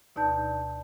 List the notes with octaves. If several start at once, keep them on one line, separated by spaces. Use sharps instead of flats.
D2 B2 D#4 D5 A5 G6